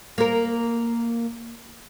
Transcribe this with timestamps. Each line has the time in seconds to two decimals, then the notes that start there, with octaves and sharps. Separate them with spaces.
0.18 A#3 A#4